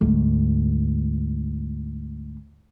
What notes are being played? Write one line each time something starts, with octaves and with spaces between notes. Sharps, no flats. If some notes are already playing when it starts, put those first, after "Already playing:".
D2 G#2